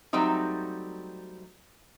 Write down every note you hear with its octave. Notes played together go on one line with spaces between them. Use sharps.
F#3 G3 A3 C4 D#4